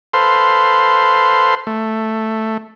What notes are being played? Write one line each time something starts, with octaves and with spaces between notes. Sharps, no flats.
A4 B4 C5 F5 C6
A3